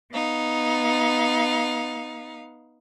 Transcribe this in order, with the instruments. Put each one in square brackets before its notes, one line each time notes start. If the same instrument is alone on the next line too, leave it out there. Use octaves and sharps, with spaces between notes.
[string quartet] B3 D#4 F5